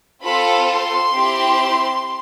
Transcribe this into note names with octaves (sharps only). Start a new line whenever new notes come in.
C4 F4 A4 B5
C6
C4 E4 G4